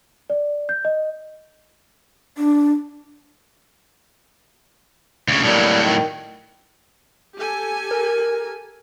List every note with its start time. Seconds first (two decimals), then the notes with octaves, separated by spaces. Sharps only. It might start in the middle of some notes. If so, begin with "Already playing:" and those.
0.30 D5
0.69 G6
0.85 D#5
2.37 D4
5.28 D2 C#3
5.44 A2 F#3 G3 A#3
5.82 D#3
7.36 G4 A4 G#5
7.91 A#4